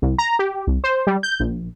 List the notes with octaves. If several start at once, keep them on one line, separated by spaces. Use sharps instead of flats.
C2
A#5
G4
C2
C5
G3
G6
A#1